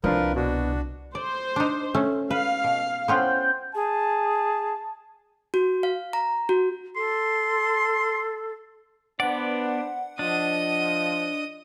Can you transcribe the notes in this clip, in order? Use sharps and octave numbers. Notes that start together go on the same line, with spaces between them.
C2 F3 D4 F4 A#4 B4
B2 D4 F#4
C5 D5
D4 D#4
A3 C#4
B4 F5
B2
B3 C#4 F4 C5 F#5 G5
G#4 A5
F#4
F5
A#5
F#4
A4 C6
B3 D4 B4 C5 D5 F#5
F3 D4 D#5 D#6